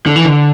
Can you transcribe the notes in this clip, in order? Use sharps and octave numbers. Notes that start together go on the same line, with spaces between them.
D3
E3
D3